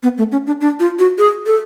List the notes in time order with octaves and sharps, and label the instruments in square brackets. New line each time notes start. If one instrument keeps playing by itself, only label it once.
[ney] B3
A3
C#4
D4
D4
F4
F#4
G#4
A4